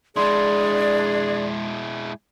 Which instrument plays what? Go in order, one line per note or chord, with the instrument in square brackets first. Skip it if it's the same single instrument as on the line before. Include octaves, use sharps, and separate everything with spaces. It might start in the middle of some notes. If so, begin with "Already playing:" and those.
[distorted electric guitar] G#3 E4 [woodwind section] D4 G#4 [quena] D5 [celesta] C6